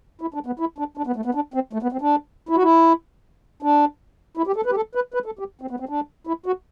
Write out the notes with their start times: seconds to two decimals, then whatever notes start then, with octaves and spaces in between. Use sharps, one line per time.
0.21 E4
0.34 D4
0.46 B3
0.59 E4
0.78 D4
0.97 D4
1.07 B3
1.16 A3
1.25 B3
1.35 D4
1.54 C4
1.73 A3
1.83 B3
1.92 C4
2.01 D4
2.49 E4
2.56 F#4
2.63 E4
3.62 D4
4.37 E4
4.47 G4
4.56 A4
4.66 B4
4.71 G4
4.76 A4
4.95 B4
5.14 B4
5.26 A4
5.39 G4
5.61 C4
5.71 B3
5.80 C4
5.89 D4
6.27 E4
6.46 F#4